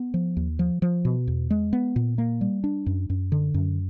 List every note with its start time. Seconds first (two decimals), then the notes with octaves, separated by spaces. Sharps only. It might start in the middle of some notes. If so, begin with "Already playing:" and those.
Already playing: B3
0.14 F3
0.37 D#2
0.59 F3
0.82 F3
1.05 B2
1.27 E2
1.50 G#3
1.73 B3
1.96 A#2
2.18 A#3
2.41 G3
2.64 D4
2.86 F#2
3.10 F#2
3.32 D3
3.54 F#2